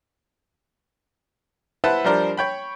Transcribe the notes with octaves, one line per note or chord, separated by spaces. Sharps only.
E4 B4 C5 E5 F#5 A5
F3 G3 D4 A#4 C5
C#5 G5 B5